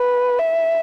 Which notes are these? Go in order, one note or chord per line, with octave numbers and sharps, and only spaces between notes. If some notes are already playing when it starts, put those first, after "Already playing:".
Already playing: B4
E5